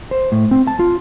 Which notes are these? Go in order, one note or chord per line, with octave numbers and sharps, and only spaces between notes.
C5
A2
C4
A5
F4